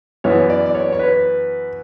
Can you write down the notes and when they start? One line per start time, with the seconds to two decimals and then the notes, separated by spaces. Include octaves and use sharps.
0.24 F#2 E3 B3 C#5
0.50 D5
0.66 D5
0.75 C#5
0.92 C#5
0.99 B4